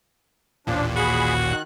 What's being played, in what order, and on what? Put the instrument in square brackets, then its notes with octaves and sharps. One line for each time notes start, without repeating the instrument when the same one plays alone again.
[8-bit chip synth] A1 D#2 A#2 [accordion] F3 D4
[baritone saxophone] F#4 [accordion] G#4 B5
[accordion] D#3 F#6